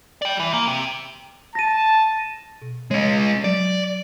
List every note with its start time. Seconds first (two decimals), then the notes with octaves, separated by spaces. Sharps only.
0.22 D5 G5
0.40 E3
0.53 A#3
0.68 C3
1.55 A5 A#6 D#7
2.62 B2
2.91 G#3 C#4 C#5 D#5
3.44 F#3 D5